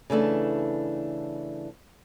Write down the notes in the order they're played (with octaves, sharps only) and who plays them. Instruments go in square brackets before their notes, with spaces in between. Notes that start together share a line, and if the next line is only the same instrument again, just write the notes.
[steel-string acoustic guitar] C#3 E3 A3 D4